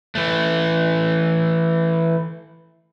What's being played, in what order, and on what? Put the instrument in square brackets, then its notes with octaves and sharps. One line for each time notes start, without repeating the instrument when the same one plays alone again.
[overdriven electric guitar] E3 A3